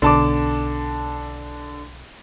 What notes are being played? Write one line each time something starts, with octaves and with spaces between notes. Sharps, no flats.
B1 D3 A5 D6